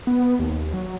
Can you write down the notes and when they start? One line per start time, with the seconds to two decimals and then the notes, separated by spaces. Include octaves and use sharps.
0.07 B3
0.39 D#2
0.74 F#3